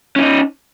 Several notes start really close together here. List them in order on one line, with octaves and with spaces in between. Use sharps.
C#4 E4 D#4